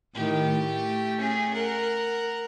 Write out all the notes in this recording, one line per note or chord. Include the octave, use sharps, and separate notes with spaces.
A2 D#3 G4
A3
C#4 G#4
A#4 F#5